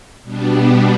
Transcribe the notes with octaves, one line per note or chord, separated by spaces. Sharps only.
B2 G3 B3 D4